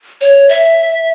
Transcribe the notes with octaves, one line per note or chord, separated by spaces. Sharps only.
C#5
E5